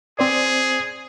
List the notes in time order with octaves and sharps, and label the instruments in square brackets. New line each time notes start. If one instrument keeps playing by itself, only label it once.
[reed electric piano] C4 C5 D5 [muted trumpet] G#4